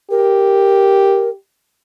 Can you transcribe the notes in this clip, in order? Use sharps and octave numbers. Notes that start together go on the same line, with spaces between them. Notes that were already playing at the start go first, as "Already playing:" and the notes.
G4 A#4